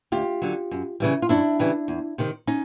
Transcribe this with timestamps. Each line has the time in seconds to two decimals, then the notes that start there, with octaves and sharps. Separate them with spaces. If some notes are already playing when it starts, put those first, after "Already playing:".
0.12 D2 F4 G4
0.42 D3 F#3
0.71 F#2
1.00 C#3 E3 G3
1.22 F4
1.29 F#2 D4 E4
1.59 C#3 E3 G3
1.88 E2
2.18 C3 D#3
2.47 C#4 D#4